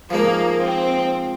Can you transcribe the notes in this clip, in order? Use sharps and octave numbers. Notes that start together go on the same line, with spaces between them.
F3 G#3 A#3 D#4
C4